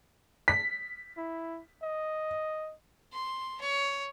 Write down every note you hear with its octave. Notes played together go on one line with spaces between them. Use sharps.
B6
E4
D#5
C6
C#5